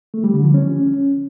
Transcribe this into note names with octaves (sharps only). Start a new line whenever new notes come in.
A3
G3
D3
F3
C#4